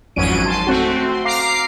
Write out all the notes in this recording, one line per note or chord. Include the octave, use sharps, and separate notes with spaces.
G#1 F2 F#3 C#4 D7 D#7
A5 C6
A3 C4 F#4
C6
F5 A#5 D6 C7